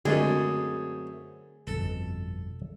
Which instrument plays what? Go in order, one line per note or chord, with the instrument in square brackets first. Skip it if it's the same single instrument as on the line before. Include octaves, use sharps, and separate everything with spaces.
[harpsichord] F#2 A3 C4 [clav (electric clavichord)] D3 G#3 D5 [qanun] G#4
[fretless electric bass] G1 F2 B2 [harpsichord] A4